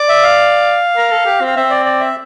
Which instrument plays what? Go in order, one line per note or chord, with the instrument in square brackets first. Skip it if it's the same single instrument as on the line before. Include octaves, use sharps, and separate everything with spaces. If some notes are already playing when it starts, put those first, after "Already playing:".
Already playing: [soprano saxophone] D5
[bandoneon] E5
F5
[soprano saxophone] A#4
A4
G4
C4
[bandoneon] F5
[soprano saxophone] C4 [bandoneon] E5
[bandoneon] D5
D5
E5